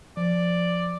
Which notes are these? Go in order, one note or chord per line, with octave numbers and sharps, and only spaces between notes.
F3 D5